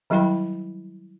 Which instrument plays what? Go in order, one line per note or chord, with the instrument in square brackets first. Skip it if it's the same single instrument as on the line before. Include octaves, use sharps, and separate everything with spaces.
[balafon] D#3 F#3 G3 E4 G5 B5